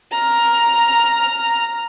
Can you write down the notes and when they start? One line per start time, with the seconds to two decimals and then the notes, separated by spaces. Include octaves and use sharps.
0.12 A#5 F6